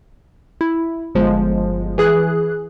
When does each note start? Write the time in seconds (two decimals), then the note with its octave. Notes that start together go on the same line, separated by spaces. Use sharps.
0.61 E4
1.15 G1 F3 G#3
1.98 E3 G#4 F#6